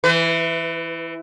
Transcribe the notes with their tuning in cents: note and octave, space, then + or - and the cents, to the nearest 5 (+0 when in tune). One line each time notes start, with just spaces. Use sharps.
E3 +0 B4 +30